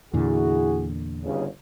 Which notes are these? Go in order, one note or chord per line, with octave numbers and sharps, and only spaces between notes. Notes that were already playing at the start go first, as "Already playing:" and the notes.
E2 A#2 D3 E4 F#4 G#4
G1 D#2 C#3